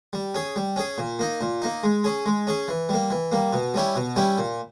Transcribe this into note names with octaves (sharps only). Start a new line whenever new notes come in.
G3
C#4 G#4
G3
C#4 G#4
A#2
A#3 D#4
A#2
A#3 D#4
G#3
C#4 G#4
G#3
C#4 G#4
E3
G3 A#3
E3
G3 A#3
B2
G3 C#4 E4 G4
B2
G3 C#4 E4 G4
A#2